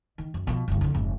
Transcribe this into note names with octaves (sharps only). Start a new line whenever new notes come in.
D#3
F#2
B2 F3
F#1 G2
F2 D3
F1 G#2